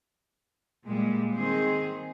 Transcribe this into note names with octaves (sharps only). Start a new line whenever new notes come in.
A#2 G3 G#3
D#3 C4 G#4 C5